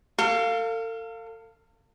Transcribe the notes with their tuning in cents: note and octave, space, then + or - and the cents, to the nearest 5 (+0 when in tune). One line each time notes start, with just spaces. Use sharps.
A4 +40 F5 +0